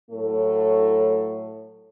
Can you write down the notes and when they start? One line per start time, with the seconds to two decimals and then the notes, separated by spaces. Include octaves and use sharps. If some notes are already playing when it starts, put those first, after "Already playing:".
0.11 A2 F#3 A3 A4